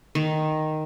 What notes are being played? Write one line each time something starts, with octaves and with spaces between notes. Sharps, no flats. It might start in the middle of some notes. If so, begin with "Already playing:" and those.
D#3